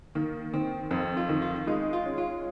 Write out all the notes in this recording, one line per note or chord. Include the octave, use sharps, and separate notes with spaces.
D#3 A#3
D#3 C4
F2 C4
F4
D#3
F4
G#3 D#4
F4
C#4
F4